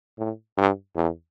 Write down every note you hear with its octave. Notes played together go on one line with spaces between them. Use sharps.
A2
G2
E2